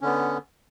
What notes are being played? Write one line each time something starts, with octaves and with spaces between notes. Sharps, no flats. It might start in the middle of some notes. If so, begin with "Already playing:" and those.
D3 B3 C#4